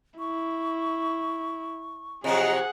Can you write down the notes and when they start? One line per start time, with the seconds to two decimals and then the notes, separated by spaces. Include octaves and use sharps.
0.19 E4 C#6
2.24 C3 F3 F#3 G#4 D#5 F#5